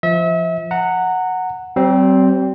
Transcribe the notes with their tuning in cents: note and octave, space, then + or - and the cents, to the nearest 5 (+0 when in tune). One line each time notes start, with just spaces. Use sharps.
F3 -15 E5 -35
F#5 +0 A#5 -25
G3 -45 C4 +0